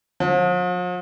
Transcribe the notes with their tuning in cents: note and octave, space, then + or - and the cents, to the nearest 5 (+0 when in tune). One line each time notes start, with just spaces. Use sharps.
F3 +45